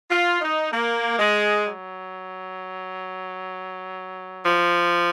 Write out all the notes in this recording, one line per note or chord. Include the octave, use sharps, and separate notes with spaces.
F4
D#4
A#3
G#3
F#3
F3